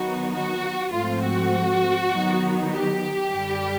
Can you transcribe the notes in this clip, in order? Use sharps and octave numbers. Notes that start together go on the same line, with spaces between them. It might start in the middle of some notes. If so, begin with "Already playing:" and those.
Already playing: D#3 F#3 B3 D#4 F#4
F#4
G#2 F3 A3 C4 F4
F#4
D#3 F#3 B3 D#4
G4
F#2 D3 G3